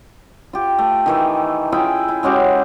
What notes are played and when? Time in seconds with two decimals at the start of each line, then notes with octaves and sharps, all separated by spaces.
0.53 F4 G4
0.79 A3
1.06 D#3 E3 A3
1.72 E4 F4 G#4 G5
2.09 E4
2.23 G#3 C#4 F#4 G4